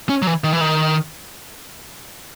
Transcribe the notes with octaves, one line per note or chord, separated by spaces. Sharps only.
C#4
F#3
E3
D#3
E3
D#3